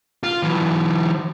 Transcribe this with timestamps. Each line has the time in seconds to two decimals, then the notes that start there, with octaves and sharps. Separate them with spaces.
0.23 F4
0.43 E3 F#3